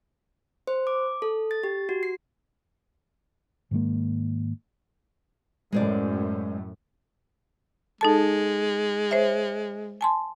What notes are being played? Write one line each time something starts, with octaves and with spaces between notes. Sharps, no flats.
C5
D6
A4
A6
G4
F#4
C7
G#2 D#3 G#3 A#3
F#2 A2 G#3 C5 D5
G#3 D#4 A4 A5
C5 C#5 E5
G#5 A5 C6